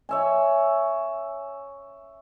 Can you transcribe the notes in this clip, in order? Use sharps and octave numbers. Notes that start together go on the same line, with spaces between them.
C#5 E5 G#5